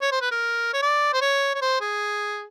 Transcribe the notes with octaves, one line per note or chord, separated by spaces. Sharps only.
C#5
C5
B4
A#4
C#5
D5
C5
C#5
C#5
C5
G#4